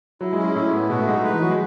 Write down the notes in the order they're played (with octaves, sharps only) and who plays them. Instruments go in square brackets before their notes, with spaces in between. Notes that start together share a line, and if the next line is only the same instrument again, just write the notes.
[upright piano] F#3 [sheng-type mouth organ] E4
[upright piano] G#3
[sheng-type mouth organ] C#4
[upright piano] G#3
[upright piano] A2 [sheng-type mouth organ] E4
[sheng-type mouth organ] B3
[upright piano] B2 [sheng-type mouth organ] F#4
[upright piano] A3
[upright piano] G#3 [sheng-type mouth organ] D#4
[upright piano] A3
[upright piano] G#3 [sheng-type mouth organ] B4
[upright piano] E3
[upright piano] F#3 [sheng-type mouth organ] F#4
[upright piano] G#3